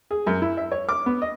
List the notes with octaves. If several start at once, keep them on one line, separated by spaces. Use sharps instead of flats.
G#4
F#2
E4
E5
C#5
D6
B3
D#5